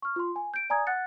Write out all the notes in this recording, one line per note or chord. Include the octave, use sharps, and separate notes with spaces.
C#6 F6
F4 C6
G#5
G6 D7
D5 G#5 A#5 D#6 G#6
F#5 F#6 A6 C#7